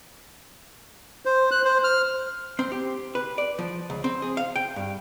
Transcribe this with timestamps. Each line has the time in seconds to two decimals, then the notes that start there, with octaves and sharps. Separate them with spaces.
1.25 C5
1.51 F#6
1.65 C5
1.84 F6
2.59 C4
2.72 G4
3.15 B4
3.38 D5
3.59 F3
3.90 C#2
4.04 C4
4.22 G#4
4.37 F5
4.56 G5
4.76 G2